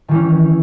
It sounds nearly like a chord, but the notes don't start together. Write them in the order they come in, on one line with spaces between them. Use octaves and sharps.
D#3 E3 C#4